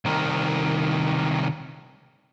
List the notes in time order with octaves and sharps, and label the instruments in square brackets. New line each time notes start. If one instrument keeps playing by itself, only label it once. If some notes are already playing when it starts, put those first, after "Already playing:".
[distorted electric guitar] C2 D#3